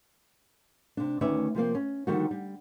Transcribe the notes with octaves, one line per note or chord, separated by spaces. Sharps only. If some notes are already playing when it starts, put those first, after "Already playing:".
C3 D4
D2 D#3 C#4 B4 D5 E5
C3 F3 A#3 C4
C#4
D3 D#3 F3 G3 A#3 F#4
G3